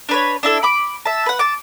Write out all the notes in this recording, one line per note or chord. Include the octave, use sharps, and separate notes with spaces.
D4 B4 C#5
D4 E4 A4
B5 D6
E5 A5
B4 F#5
A5 D6